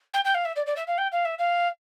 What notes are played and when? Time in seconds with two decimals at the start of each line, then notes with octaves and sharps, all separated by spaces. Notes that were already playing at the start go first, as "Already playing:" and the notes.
0.13 G5
0.25 G5
0.34 F5
0.45 E5
0.56 D5
0.66 D5
0.76 E5
0.87 F5
0.98 G5
1.12 F5
1.25 E5
1.38 F5